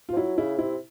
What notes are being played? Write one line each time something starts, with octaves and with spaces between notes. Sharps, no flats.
F4
F3
F#3 E4
C#3 E4
C3 E4